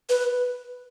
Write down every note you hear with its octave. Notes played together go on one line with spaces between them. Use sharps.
B4